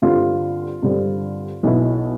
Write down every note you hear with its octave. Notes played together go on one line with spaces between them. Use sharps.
G2 D3 G3 C4 F4
G2 D3 G3 C4
B1 B2 B3 E4